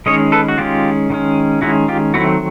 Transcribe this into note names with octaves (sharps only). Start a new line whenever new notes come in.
D#3 G#3 C#4 C#5 D#5
A4 B4
F#4
D#3 G#3 C#4 F4 G4
D#3 G#3 C#4
D#3 G#3 C#4 E4 F#4
F4 G4
D#3 F#3 A3 C4 E4 F#4